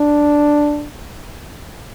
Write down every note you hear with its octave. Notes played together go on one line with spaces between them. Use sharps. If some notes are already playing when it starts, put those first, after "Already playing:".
Already playing: D4